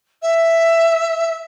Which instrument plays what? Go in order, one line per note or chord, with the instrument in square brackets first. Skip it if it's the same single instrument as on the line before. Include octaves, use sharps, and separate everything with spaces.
[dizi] E5